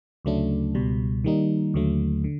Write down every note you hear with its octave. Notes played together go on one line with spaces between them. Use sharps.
D2 C#3 F#3 A3 D4
C#2 B2 G3
D#3 G3 A#3 D#4
D#2 D3 F#3 A3
D3